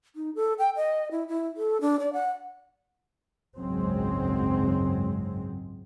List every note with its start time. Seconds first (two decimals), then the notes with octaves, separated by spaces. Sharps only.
0.16 D#4
0.35 A4
0.59 G5
0.76 D#5
1.11 E4
1.28 E4
1.57 A4
1.81 D4
1.99 D5
2.13 F#5
3.57 G#1 C#2 F#2 F#3 G#3 C4